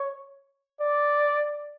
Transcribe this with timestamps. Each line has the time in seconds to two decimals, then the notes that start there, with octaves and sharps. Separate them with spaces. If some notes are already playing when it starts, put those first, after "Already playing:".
Already playing: C#5
0.81 D5